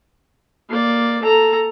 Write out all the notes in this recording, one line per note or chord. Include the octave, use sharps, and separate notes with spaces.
A#3 D5
A4 A#5